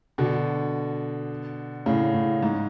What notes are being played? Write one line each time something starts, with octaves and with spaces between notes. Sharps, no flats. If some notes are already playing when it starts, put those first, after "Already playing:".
B2 D3
A2 C#3
A2
G#2